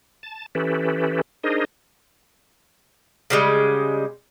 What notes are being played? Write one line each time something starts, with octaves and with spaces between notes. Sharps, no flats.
A5
E3 C#4 G4 A4 B4
D4 D#4 G#4 A#4 C5 D#5
C#3 G3 G#3